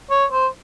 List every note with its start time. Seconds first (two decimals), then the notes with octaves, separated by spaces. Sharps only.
0.11 C#5
0.32 C5